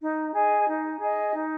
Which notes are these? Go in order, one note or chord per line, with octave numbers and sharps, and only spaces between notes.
D#4
G#4 D#5 G#5
D#4
G#4 D#5 G#5
D#4